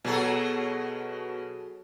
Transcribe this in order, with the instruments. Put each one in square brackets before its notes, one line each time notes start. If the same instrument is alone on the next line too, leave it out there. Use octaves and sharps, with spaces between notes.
[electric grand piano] B2 F#4 [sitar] F#3 G#4 A4